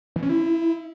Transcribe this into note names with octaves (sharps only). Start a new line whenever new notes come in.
E3
C#4
E4